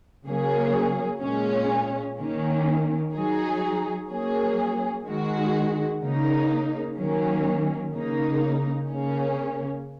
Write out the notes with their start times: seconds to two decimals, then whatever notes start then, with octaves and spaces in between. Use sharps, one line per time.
0.26 C#3 F#3 A#3 C#4 G#4
1.21 A#2 G#3 C#4
2.18 D#3 A#3 C#4
3.13 F#3 D#4 G#4
4.09 F#3 A#3 C#4 G#4
5.05 D#3 G#3 F#4
6.01 C#3 A#3 D#4
6.97 D#3 F#3 A#3 C#4
7.93 C#3 A#3 D#4
8.88 C#3 A#3 C#4